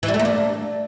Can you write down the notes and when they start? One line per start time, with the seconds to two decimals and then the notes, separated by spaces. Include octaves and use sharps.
0.03 E3
0.08 G3
0.14 A3
0.19 A#3
0.25 D4